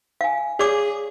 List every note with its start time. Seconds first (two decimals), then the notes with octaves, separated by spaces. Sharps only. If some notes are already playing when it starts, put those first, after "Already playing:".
0.21 F5 G#5
0.59 G#4 C#5 D5 D6